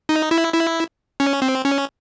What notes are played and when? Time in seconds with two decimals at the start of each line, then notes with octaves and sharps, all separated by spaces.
0.09 D#4
0.31 E4
0.54 E4
1.20 C#4
1.42 C4
1.65 C#4